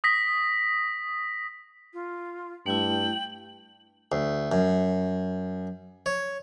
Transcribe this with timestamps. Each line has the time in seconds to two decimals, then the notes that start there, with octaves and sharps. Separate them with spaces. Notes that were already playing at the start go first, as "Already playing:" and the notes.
0.04 D#6 A#6 B6
1.94 F4
2.66 G2 A3 E4 G5 F#7
4.12 D2
4.52 F#2
6.06 C#5